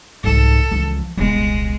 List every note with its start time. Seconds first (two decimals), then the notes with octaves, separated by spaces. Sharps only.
0.24 C2 F2 G#2 A4
0.72 C#2 E3 F3
1.17 D#1 C2 G#3 B3